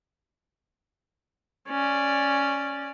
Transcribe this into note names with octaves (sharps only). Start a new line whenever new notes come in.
C#4 D5